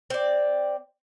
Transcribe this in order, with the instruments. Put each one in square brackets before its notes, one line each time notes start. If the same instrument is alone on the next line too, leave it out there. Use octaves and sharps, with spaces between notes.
[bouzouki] C4 D5